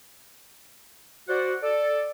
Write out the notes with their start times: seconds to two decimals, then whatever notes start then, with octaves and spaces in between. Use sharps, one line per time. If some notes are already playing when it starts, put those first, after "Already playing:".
1.28 F#4 C5 D5 F#5
1.62 A4 D5